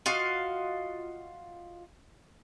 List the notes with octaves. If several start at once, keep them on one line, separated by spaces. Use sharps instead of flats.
F4 F#4 D#5 F5